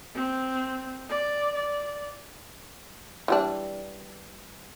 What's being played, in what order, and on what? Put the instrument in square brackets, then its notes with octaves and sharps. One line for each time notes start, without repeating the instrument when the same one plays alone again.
[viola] C4
D5
D5
[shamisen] E3 G3 D4